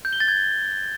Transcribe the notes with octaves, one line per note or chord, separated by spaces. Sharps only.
G6
G7
A6
G#6